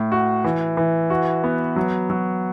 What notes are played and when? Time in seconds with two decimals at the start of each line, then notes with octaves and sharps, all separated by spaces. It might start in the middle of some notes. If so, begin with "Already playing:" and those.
Already playing: A2
0.12 F#4
0.44 E3
0.77 E3
1.10 F#4
1.44 B3
1.76 F#3
2.10 F#3